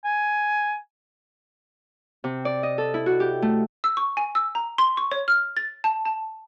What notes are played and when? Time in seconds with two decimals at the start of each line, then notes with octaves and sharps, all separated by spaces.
0.05 G#5
2.24 C3
2.45 D5
2.63 D#5
2.78 A4
2.94 E4
3.06 F#4
3.20 G4
3.42 A3
3.84 E6
3.97 C#6
4.17 G#5
4.35 E6
4.55 A#5
4.78 C6
4.97 C#6
5.11 C#5
5.28 F6
5.57 A6
5.84 A5
6.05 A5